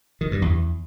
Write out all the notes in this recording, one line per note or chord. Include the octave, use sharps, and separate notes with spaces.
D#3
G2
E2